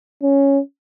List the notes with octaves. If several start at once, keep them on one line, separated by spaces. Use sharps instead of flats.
C#4